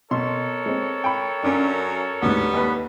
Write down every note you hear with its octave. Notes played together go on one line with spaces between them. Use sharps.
B2 A4 A#4 C#5 C6
G#3 C4
G5 B5
F#2 C#4 D4
D2 G#2 G3 B3
D#2 B4